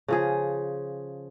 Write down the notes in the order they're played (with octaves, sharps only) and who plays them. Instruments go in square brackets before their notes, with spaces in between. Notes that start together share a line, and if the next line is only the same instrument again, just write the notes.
[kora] C#3 F3 G#4